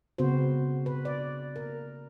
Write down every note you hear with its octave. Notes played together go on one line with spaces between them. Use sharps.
C#3 B3 C4 F#4 C5
B4
D5
A#4